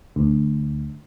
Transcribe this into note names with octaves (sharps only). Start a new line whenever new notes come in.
D2